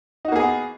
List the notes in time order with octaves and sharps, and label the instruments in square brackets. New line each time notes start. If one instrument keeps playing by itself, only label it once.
[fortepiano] D#4
F#4
A#3
G#4
B3